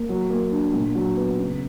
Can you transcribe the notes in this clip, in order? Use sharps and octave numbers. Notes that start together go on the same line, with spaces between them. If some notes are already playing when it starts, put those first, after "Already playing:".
Already playing: A#3
F#3
A#3
D4
A#2
F#3
B3
C#3